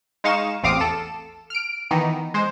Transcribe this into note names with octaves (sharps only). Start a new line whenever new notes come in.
G#3 D#4 D#5 F5 C#6 E7
A1 E2 C4 F5 D6 D#6
A4 E7
F6 D7
D#3 E3 B3 D#4
G#3 C5